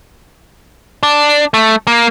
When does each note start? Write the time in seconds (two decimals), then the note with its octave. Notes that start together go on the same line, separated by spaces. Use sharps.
1.03 D4
1.54 A3
1.87 A#3